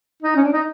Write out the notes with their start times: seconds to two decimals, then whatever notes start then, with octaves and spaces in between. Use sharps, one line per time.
0.23 D#4
0.36 C#4
0.44 D4
0.52 D#4